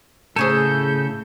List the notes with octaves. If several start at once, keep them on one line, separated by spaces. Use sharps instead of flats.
A2 C#3 G#4 A4 C#5 G#5 G6